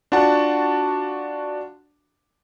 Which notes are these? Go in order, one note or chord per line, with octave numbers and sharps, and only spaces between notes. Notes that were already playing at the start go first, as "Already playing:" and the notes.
D4 F4 F#4 F#5 A5